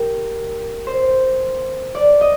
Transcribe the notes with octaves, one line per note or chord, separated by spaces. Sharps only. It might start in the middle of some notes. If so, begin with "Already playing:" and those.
Already playing: G4 A#4
C5
D5
D#5